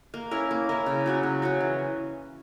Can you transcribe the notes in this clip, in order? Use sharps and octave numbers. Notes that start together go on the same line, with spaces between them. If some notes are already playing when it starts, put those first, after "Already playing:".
A#3
C#4 E4 A#4
A#3
C#4 E4 A#4
C#3
F#3 C#4 F#4
C#3
F#3 C#4 F#4
E3